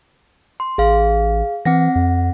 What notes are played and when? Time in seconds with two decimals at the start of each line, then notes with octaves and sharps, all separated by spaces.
0.60 C6
0.78 A1 G#4 F5
1.65 E3 C4 F#5 A#6
1.96 F2